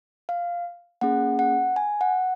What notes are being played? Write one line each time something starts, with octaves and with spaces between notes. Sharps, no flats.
F5
A#3 C#4 G#4 F#5
F#5
G#5
F#5